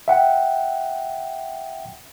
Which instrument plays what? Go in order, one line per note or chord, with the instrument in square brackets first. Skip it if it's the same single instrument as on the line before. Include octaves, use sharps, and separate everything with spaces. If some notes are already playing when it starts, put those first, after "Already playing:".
[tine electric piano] E5 F#5 G5